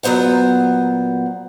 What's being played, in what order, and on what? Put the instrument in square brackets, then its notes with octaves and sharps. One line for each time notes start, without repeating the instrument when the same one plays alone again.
[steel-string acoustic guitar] A#2 F#3 B3 C5 F#5